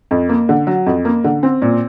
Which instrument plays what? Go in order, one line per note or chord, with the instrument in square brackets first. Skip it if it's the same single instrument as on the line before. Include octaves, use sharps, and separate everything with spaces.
[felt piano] F2
A#3
D3
F#3
F2
A#3
D3
C4
A#2